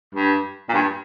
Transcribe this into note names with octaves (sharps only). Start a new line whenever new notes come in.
G2
A#2
G2